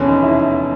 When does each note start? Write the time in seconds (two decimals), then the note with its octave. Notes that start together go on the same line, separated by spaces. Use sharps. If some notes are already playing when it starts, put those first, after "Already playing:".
Already playing: F1 E2 B2 C#4
0.08 D#4
0.23 E4